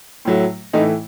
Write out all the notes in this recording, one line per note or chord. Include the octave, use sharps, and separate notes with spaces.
A2 F#3 A3
A2 E3 A3 D#4